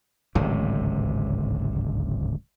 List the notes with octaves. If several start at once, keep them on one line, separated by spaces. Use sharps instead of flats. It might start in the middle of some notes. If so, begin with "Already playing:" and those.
D1 G#1 C#2 C3